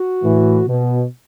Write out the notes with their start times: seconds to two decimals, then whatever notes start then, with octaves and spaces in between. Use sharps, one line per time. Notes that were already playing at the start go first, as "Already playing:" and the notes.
Already playing: F#4
0.23 A2 E3
0.67 B2